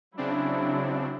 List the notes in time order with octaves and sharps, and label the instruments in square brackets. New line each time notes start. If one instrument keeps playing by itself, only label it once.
[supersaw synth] C#3 C4 D4 [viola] F#3 E4